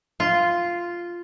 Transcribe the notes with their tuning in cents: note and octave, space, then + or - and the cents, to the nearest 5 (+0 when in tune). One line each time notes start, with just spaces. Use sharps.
F4 -5